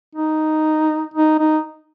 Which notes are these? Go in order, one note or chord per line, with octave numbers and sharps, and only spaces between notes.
D#4
D#4
D#4